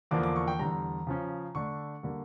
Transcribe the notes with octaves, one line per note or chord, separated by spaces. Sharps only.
E2 D3 F3 A#3 D4 D6
D6
C#6
G5
E2 D3 G3 A#5
C#3 F3 C#4
D3 A3 D4 C#6
D3 G3 A#3